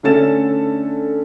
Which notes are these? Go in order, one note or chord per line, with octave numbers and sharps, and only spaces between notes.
D3 A3 C#4 A4 A6 E7